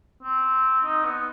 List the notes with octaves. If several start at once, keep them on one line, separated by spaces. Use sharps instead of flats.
C4
D#4
B3